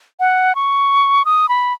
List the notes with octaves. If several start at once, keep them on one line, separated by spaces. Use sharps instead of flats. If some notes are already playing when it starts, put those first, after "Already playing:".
F#5
C#6
D#6
B5